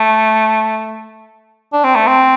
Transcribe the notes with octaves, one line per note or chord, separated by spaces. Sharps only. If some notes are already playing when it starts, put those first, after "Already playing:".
Already playing: A3
D4
C4
A3
C4